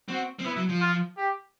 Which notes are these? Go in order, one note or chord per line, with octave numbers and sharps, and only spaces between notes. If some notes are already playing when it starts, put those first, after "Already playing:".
C4 F#4
C4
B3 E4
F#3
F3
F4
G4